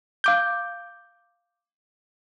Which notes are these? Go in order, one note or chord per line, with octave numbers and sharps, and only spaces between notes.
F5 D6 G6